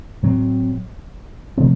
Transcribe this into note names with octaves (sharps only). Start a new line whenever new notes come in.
A2 F#3 C4
C3 F3 A3 C4